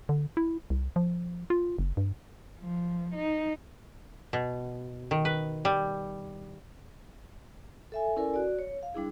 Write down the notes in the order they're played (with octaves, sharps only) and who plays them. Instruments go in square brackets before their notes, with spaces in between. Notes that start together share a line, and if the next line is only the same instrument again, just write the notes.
[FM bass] D3
E4
C2
F3
F4
F#1
G2
[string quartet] F3
D#4
[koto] B2
D#3
B4
G3
[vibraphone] A4 E5 G#5
C#4 E4 A4 A#4 D5 G#5
F#4 D5
C#5
F5
G3 D4 E4 G#4